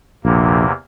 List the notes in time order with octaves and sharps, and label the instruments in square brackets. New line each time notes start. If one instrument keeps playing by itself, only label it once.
[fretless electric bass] A#1 [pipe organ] E2 C3 A#3